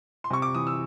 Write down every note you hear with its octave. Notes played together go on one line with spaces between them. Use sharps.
C6
C3 C#6
D6
E3 D#6
E6